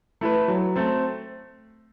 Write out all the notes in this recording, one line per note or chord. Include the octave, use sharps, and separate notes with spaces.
A3 E4 B4
F#3
A3 C4